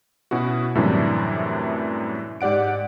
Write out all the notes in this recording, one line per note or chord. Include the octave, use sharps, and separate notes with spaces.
B2 C#4 E4 F#4
F#2 A2 C3 E3 G3 D4
G#2 G4 D5 F#5 D7